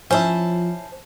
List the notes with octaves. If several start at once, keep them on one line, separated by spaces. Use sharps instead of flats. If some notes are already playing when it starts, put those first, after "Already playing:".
F3 C#4 E4 C5 A5